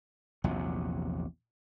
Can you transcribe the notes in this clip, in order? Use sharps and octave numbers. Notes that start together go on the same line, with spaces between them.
A#1 E2 C3 F#3